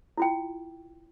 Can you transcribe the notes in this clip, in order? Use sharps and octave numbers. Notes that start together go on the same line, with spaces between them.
E4 F4 G5